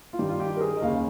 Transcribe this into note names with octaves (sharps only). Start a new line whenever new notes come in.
F4
G2 D#3 G4
F4
G4
A#4
G#4
D#5
D#2 C#3 F5